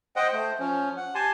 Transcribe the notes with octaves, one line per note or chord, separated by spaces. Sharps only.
C5 D#5 F#5 G5
A3 C5
F3 C#4
F#5
G4 G#5 A5 C6